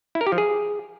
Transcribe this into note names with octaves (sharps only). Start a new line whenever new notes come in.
E4
A#4
G4
F3
G#4